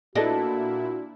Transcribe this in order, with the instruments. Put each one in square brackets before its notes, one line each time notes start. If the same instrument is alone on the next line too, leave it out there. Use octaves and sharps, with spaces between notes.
[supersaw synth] A#2 E4 [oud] D4 [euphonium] F#4 [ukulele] A4 B4 D#5